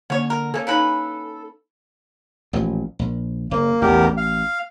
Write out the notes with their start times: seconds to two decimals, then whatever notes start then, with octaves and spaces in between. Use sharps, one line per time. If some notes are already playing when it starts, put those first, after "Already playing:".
0.10 D3 A#3 C#4 C#5
0.30 A#4
0.54 A#3 C#4 A4 G#5
0.67 C#4 D#4 E4 B4 F5 G#5
2.53 A1 A#2 F3
2.99 A#1
3.51 F#1 A#3
3.82 A1 E2 G4 A#4
4.17 F5